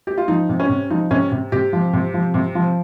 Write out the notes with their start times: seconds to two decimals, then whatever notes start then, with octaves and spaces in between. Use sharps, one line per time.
0.07 G4
0.18 F4
0.28 F3 D#4
0.49 C3
0.60 C#4
0.70 C3
0.90 F3 D#4
1.11 C3 C#4
1.32 C3
1.52 C3 G4
1.73 F3
1.93 C3
2.14 F3
2.34 C3
2.55 F3